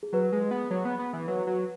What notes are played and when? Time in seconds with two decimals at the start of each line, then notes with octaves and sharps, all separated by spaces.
0.03 G#4
0.13 F#3 B4
0.32 G#3
0.42 G#4
0.51 B3
0.71 F#3
0.85 B3
0.99 B3
1.13 E3
1.28 F#3 B4
1.47 F#3